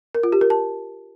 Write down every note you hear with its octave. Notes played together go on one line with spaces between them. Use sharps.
A#4
F4
G4
A#4
A5